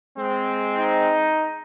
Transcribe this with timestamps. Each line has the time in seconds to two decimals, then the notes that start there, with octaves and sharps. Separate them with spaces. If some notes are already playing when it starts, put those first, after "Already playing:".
0.17 G#3 C4
0.76 D#4